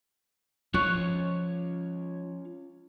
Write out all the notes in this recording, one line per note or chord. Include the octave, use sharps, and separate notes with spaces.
F3 C#4 F4 C#5 C#6 F#6